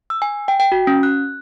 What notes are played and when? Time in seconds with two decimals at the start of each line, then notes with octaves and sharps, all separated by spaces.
0.10 E6
0.22 G#5
0.48 G5
0.60 G5
0.72 F#4
0.87 C#4
1.03 F#6